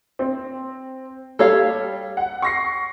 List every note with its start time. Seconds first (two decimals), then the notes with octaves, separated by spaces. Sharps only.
0.19 C4
1.39 G3 A4 C#5 F5
2.17 F#5
2.42 C#6 A#6 C7